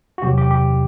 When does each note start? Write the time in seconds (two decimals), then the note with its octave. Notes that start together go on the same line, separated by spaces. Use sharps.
0.18 F#4
0.23 E2 C3 F#3 G4
0.38 G4
0.51 G4